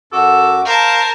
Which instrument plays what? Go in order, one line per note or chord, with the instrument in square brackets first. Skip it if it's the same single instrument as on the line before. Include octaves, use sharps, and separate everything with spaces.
[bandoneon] F#2 F#4 D6 [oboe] A4
[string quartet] A#4 A5 [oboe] C5 [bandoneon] F5